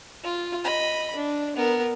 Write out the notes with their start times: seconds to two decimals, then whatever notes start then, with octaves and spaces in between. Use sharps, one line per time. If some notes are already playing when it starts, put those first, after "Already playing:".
0.23 F4
0.64 D#5 B5
1.16 D4
1.56 B3 A#4